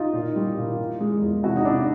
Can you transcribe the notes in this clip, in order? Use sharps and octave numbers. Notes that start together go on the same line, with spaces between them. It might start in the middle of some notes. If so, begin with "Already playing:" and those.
Already playing: D#4 F4
A#2
G3
A#2
E3
G#3
E2
C3 E4 F#4
D#4
C3 D4 E4